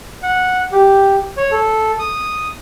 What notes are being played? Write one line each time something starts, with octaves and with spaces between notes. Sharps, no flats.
F#5
G4
C#5
A4
D#6